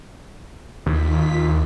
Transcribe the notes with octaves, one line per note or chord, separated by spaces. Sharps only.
D#2 D#3 F4 B6